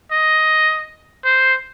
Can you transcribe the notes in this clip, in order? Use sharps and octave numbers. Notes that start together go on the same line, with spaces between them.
D#5
C5